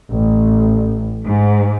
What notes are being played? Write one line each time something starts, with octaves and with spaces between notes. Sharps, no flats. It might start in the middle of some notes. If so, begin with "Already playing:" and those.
A1
G#2